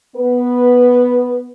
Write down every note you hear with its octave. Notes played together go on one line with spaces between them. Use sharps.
B3 B4